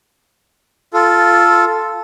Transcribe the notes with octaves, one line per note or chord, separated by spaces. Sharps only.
F4 A4